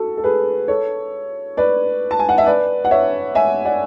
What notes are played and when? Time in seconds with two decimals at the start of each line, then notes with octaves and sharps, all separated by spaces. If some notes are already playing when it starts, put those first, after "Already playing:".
Already playing: F#4 A4
0.17 A4
0.24 G#4 B4
0.68 A4 C#5
1.57 B4 D5
2.11 A5
2.19 G#5
2.29 F#5
2.38 E5
2.46 B4 D5
2.85 F#5
2.91 C#5 E5
3.35 E5 G#5
3.65 D5 F#5